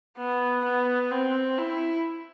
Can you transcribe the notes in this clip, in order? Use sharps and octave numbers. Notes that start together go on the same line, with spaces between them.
B3
B3
C4
E4